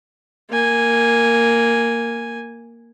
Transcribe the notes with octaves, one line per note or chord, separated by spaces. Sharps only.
A#3 G#5